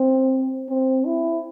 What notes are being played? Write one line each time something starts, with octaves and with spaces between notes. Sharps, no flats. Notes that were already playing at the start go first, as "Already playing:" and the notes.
Already playing: C4
C4
E4